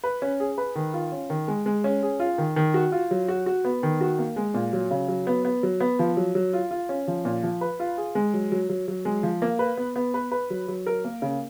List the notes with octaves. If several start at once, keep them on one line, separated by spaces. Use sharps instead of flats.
B4
C#4
G#4
B4
D#3
F4
C#4
D#3
G#3
G#3
C#4
G#4
F4
D#3
D#3
F#4
F4
F#3
F#4
F#4
B3
D#3
F#4
A#3
G#3
A#2
F#3
C#3
F#3
B3
B3
F#3
B3
F3
F#3
F#3
F4
F4
C#4
F3
A#2
F3
B4
F4
G#4
G#3
F#3
F#3
F#3
F#3
G#3
F3
A#3
B4
B3
B3
B4
B4
F#3
F#3
A#4
A#3
C#3